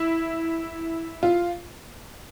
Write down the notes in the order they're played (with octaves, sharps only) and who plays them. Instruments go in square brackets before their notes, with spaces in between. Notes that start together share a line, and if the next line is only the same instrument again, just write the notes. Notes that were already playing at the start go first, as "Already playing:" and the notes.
Already playing: [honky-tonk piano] E4
F4